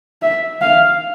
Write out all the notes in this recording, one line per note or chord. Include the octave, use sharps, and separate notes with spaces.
E5
F5